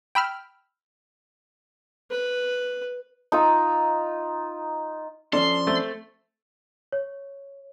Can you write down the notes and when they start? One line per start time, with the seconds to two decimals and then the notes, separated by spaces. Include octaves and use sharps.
0.15 G5 B5 E6 F6
2.11 B4
3.32 D#4 F4 A#5 E6
5.33 F3 C#4 D4 A4 C6
5.67 A3 C4
6.92 C#5